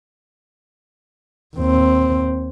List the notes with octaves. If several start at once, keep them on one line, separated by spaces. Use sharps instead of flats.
D#2 C4